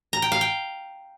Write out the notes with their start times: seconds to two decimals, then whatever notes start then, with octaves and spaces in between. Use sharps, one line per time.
0.13 A#5
0.22 G5
0.32 F5
0.41 G5